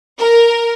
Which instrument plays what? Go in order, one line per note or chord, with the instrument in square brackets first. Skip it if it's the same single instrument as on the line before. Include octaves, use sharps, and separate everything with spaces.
[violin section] A#4